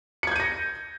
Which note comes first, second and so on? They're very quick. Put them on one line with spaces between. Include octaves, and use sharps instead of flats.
C#7 G#6 G6 D#7 A#6